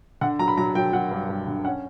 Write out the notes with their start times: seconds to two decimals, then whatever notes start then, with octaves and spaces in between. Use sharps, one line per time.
0.21 D3 F#5
0.39 F#3 A#5
0.48 B5
0.57 F#3 A#5
0.75 F#3 G5
0.93 F#3 F#5
1.11 G2
1.29 G2
1.47 D3
1.65 C#4 F#5